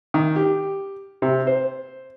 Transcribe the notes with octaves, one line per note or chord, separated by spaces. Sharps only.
D#3
G4
C3
C5